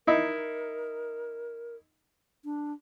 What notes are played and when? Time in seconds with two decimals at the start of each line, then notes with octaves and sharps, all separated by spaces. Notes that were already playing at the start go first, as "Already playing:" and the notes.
0.07 D#4 E4 A#4
2.45 D4